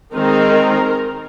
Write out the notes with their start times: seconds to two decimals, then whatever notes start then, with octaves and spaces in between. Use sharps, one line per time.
0.14 D#3 G#3 C4 D#4 A#4